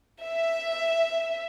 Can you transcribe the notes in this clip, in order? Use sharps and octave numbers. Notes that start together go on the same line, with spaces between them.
E5